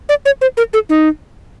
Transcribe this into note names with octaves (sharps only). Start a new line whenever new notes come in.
D5
C#5
C5
A#4
A4
D#4